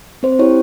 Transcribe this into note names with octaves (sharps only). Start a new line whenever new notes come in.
C4 C5
E4 G4 C#5